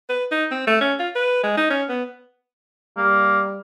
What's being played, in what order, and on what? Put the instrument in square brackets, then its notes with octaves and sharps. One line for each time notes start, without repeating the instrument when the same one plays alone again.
[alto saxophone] B4
D#4
C4
A3
C#4
F4
B4
G#3
D#4
C#4
B3
[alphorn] G3 [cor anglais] A#3